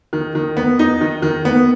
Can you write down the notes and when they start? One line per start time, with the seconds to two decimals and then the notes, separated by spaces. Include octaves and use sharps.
0.13 D#3
0.35 D#3
0.57 B3
0.79 D#4
1.01 D#3
1.22 D#3
1.45 B3